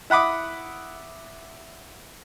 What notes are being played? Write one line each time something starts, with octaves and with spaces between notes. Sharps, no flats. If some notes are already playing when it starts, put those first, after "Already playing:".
E4 F#5 B5 D6 D#6